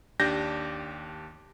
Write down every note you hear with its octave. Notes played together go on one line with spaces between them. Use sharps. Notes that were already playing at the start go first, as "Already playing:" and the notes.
D#2 D4 G4 G6 A#6